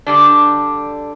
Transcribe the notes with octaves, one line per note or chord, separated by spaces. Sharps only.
D3 G3 D4